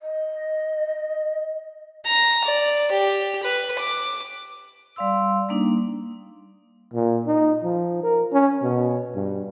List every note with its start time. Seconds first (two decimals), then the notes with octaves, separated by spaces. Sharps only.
0.01 D#5
2.06 A#5
2.44 D5
2.92 G4
3.43 B4
3.79 D6
4.96 G3 D5 F5 C6 E6
5.49 G3 A#3 D4 D#4
6.94 A#2
7.27 D#4
7.63 F3
8.03 A#4
8.33 C#4
8.62 B2
9.15 G2